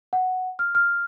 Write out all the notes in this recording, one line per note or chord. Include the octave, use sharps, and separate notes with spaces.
F#5
F6
F6